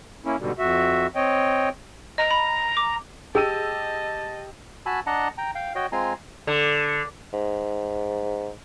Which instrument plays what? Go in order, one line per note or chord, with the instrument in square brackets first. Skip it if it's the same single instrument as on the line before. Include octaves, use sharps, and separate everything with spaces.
[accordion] A#3 C#4 E4
G#2 B2 D3 G3
F2 F#4 E5
C4 C#5 D#5 G5
[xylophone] D#5 [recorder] A#5
[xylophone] B5
D6
[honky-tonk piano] G4 E6 D#7 [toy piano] G#4 [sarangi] D#5 [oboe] A5
[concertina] F#4 G#5 A5 B5 E6
D4 D#5 F#5 A5 A#5
G5 A#5
F5 G5
F#4 C#5 D#5 G5
G#3 C4 F4 G#5 A#5 C6
[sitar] D3
[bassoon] G#2